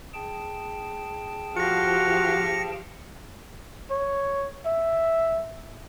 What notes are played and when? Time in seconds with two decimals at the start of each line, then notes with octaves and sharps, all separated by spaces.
0.14 G#4 G5 A5
1.57 F3 F#4 G4 F5 A#6 C#7
3.91 C#5
4.66 E5